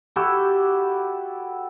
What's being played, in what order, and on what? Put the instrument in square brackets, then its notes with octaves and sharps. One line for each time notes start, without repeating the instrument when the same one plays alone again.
[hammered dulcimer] E4 F#4 G4 A4